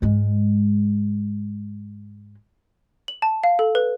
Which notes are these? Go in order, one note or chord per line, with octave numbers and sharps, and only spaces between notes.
G#2 G#3
F#7
A5
F5
A4
B4